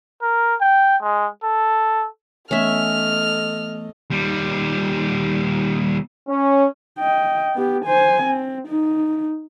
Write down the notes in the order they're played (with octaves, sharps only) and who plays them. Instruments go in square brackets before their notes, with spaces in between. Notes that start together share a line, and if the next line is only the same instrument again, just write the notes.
[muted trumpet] A#4
G5
G#3
A4
[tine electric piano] E3 A3 B3 [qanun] C#4 E5 [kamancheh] A4 D#5 [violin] F6
[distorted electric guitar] D#2 G3
[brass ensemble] C#4
[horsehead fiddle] D#5 G5
B3 G4
C5 G#5
C4
D#4